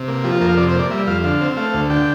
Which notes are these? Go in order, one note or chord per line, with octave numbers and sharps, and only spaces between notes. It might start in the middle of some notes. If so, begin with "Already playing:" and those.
Already playing: C3
A#3
F3 G4
F4
F2 A#4
F5
C3 D5
C5
A#3
D5
G3 E5
F2 F5
D3 F5
C4
A3 F5
D2
D3 G5